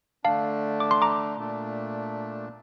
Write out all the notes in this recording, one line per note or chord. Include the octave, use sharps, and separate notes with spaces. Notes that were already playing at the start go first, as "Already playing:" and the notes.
D3 A3 D4 F5 A5
D6
C6
A#5 D6
A#2 A3 D4